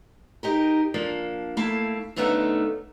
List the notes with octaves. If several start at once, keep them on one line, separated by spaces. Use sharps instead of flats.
D#4 G4 A#4
F3 A#3 D4
A3 A#3 E4 F5 A5
F#2 D3 A3 B3 D#4 F5